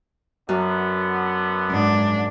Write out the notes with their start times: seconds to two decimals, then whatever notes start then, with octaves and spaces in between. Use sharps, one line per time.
0.49 F#2 D3 B3
1.71 G#2 D4